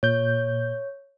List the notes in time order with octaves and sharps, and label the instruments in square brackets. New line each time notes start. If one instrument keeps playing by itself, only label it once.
[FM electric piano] A#2 G6 [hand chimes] C#5